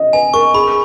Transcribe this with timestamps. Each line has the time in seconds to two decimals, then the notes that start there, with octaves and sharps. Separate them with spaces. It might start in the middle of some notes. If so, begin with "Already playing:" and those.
Already playing: D#5
0.13 B4 G#5
0.34 A#4 C#6
0.54 G#4 B5